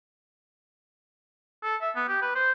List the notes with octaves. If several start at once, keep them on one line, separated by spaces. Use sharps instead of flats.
A4
E5
B3
G4
B4
C5